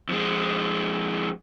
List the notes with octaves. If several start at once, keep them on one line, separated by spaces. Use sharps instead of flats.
F2 G#3